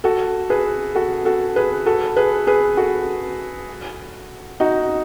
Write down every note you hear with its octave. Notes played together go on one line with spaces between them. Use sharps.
F#4 A4
G#4 B4
F#4 A4
F#4 A4
G#4 B4
F#4 A4
G#4 B4
G#4 B4
F#4 A4
D#4 F#4